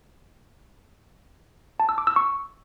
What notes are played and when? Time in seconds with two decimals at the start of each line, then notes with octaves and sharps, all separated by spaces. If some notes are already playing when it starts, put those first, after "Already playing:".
1.80 A5
1.89 E6
1.98 D6
2.07 E6
2.16 C#6